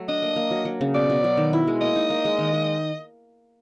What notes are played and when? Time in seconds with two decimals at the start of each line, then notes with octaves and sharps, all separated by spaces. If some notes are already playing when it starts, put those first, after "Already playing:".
Already playing: F#3 A3
0.08 D4 D#5
0.23 A#3
0.36 A#3
0.51 F#3
0.65 F#3
0.81 C#3
0.94 B2 D5
1.10 B2
1.24 F#3
1.37 D#3
1.53 E4
1.67 G#3
1.81 A#3 D#5
1.96 D#4
2.10 A#3
2.25 G#3
2.38 D#3
2.53 G#3